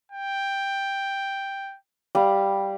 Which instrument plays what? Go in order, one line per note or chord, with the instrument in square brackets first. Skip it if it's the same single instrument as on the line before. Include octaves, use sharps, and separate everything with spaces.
[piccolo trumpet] G5
[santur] G3 F5